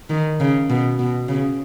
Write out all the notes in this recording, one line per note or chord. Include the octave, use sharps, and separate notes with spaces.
D#3
C#3
B2
B2
C#3